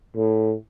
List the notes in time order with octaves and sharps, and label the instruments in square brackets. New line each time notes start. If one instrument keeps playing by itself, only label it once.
[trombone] A2